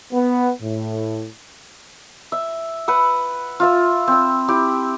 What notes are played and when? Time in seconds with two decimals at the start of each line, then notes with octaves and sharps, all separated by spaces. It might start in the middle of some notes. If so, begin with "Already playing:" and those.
0.12 B3
0.62 A2
2.32 E5
2.88 B4 F#5 E6
3.60 F4 E5 E6
4.08 C4 E6
4.48 E4 G4